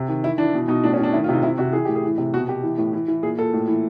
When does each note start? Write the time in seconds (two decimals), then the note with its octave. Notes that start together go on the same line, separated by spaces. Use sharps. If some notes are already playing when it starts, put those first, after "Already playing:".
Already playing: C3
0.08 D#3
0.23 E3 E4
0.38 E3 D4
0.54 B2
0.68 B2 D#4
0.84 A2 D4
0.94 C#4
0.99 A2 D4
1.13 D#3 E4
1.24 F4
1.29 C3 D#4
1.43 C3 E4
1.58 C3 F#4
1.73 E3 G#4
1.85 A2 G4
1.95 G#4
2.04 E3
2.18 C3
2.34 B2 F#4
2.48 B2 G4
2.63 E3
2.78 A2
2.93 E3
3.08 E3
3.23 A#2 G#4
3.38 A#2 A4
3.53 A2
3.68 E3